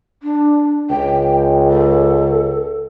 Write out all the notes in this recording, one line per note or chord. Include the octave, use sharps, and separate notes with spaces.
D4
C#2 G5
A4